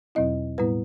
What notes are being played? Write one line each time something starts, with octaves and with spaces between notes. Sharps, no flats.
E2 B2 F#3 C4 E4 D#5
A2 G3 B3 E4 B4